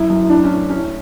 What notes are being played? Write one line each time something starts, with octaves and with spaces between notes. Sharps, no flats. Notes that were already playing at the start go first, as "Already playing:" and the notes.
Already playing: F#2 E4
F#2
A2 D4
C#4
A2
A2 C#4